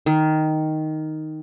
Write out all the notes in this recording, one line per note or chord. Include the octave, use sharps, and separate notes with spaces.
D#3